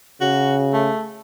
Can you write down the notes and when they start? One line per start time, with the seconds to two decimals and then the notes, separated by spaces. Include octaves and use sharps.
0.21 C#3 F#4
0.73 A3